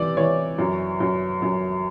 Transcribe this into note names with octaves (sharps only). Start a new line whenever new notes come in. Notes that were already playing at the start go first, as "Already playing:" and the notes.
Already playing: C3 E3 D5
E3 C#5
F#2
F#2
F#2